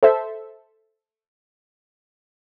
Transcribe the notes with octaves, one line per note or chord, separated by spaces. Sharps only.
A4 C5 E5